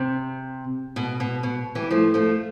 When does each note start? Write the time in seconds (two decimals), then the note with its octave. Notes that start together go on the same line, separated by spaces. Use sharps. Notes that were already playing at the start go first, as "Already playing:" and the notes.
Already playing: C3
0.96 B2
1.20 B2
1.43 B2
1.75 E3 G3
1.91 F3 A3
2.14 F3 A3